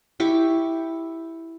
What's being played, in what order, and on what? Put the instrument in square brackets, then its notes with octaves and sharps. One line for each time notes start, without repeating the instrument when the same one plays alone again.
[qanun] E4 G4 C#6 D6